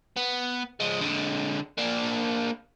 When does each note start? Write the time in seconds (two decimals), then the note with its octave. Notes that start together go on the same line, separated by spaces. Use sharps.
0.16 B3
0.80 F3 G#3
1.01 D3 G#3
1.78 A#3 D4